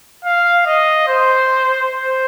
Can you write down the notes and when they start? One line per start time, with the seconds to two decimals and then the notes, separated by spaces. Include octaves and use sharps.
0.25 F5
0.66 D#5
1.08 C5
1.92 C5